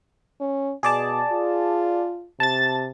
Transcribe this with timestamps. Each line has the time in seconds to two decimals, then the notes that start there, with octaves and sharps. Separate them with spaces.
0.41 C#4
0.83 B2 G#4 D5 A5
1.32 F4
2.40 C3 A5 A6